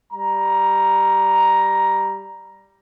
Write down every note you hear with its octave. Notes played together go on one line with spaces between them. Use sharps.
G3 A#5